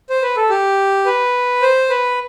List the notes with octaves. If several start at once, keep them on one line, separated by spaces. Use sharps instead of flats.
C5
B4
A4
G4
B4
C5
B4